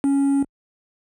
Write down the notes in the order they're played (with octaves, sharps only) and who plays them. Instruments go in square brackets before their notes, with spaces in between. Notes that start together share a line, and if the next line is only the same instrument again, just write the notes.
[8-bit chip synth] C#4